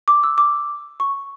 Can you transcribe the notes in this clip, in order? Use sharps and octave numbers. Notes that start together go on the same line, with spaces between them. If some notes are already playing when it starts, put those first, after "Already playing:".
D6
E6
D6
C#6